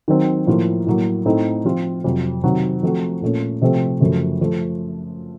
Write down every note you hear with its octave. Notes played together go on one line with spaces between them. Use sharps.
D#3 F#3 C4
A2 F3 A#3 F4
A2 F#3 A#3
A2 A3 C4 D#4
F3 C4 F4
F2 C3 F#3
C3 D#3 F#3 C4 F#4
F3 A3 C4 F#4
A#2 A3 C#4
C3 F3 A3 C4 F#4
F#2 C#3 F3 A3
F3 A3